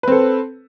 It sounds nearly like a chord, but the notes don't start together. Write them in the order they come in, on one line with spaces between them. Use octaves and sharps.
B4 C4 A4